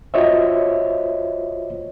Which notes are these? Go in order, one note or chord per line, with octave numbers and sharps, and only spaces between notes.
F4 F#4 C5 C#5 D#5 E5